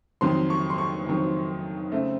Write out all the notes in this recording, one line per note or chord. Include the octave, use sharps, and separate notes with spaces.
F2 D#3 F#3 C6
C#6
C6
C#6
F2 D#3 F#3
C#3 A3 C4